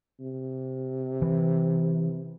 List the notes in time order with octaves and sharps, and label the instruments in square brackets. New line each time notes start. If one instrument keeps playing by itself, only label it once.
[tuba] C3
[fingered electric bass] E3